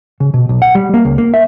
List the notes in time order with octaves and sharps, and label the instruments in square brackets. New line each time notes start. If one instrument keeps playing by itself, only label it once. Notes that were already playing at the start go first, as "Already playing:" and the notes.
[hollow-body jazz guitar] C#3
B2
B1
F#5
G3
A#3
C#2
A#3
E5